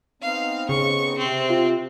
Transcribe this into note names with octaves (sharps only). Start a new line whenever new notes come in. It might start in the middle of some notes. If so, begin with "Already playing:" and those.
B3 C4 D#4 F5
C#3 C#6
C3 C4
F4